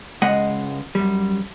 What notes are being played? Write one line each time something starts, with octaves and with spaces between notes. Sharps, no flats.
C#2 G#3 D#5 F#5
F#2 G3